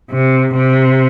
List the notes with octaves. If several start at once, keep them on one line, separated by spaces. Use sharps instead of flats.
C3
C3